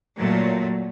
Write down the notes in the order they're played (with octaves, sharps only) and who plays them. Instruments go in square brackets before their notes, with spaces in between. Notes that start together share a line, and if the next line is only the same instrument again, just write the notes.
[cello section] A#2 F#3 A3